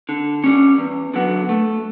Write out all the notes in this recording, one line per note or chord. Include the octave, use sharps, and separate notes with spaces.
D3
G3 C#4
E2
D3 F#3 B3
A3